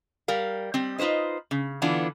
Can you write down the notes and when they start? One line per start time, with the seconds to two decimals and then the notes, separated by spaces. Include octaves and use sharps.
0.28 G3 A#4 F5
0.74 G3 C4
0.98 D#4 F4 B4 C5 D#5
1.51 C#3
1.82 D3 E3 B3 D4 F4